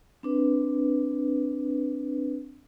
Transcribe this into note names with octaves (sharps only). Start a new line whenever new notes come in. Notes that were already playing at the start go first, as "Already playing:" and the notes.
C4 D4 B4